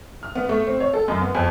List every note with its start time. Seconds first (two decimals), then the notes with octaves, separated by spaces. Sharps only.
0.23 F6
0.35 B3
0.49 A3
0.67 C4
0.80 C#5
0.94 A4
1.08 F#2
1.22 B3
1.35 F2